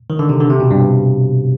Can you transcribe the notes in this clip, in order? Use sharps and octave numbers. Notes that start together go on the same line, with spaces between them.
D#3
D3
C3
D3
C3
B2
G2